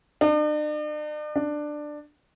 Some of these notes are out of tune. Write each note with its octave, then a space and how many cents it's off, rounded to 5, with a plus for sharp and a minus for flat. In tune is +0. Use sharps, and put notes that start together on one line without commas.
D4 +45
D4 +15